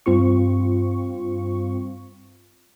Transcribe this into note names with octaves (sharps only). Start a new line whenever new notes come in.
G2 C4 F4 C#6